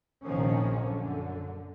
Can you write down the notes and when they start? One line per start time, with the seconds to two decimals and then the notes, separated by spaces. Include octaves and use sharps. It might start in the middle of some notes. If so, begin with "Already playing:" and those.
0.23 A#1 C3 D#3 F3 A#3 C#4
0.77 F#2 D3